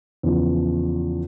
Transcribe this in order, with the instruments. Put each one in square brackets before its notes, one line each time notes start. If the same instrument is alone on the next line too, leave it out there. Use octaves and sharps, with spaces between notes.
[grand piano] E2 C#3 F3